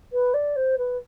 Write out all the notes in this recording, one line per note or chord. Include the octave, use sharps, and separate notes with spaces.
B4
D5
C5
B4